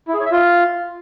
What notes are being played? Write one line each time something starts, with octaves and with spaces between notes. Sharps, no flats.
E4
G#4
C#5
E5
F4